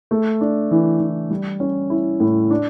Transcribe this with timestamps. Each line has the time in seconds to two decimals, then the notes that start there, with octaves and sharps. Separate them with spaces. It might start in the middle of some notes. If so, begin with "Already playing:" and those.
0.11 A3
0.41 D4
0.71 E3
1.00 E3
1.30 G3
1.60 C#4
1.90 E4
2.20 A2
2.50 D4